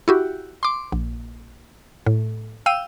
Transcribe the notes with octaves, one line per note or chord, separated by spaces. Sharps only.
E4 F#4 G4
C6 D6
A#1
A2
F5 G5 E6 D#7